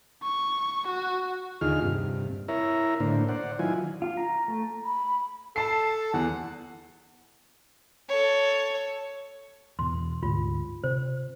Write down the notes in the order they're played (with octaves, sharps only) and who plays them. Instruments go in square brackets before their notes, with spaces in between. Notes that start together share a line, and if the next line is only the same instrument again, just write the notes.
[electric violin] C#6
F#4
[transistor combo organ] D#2 D3 D#4 F4 G#4 F6
G2 C3
E4 A#4 C#5 E5 A#5
A2 D3 A#3 D4 C5
C5 D5 F#5
D#3 F#3 E4 F4 G#5
[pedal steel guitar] F4
A#5
A3
[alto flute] B5
[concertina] A4 [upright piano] A5 C7
[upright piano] E2 [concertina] F#5
[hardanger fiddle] A4 C#5
[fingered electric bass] E2 B2 [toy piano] C6
[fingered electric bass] D2 G#2 [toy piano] F4
[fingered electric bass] C3 [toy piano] C5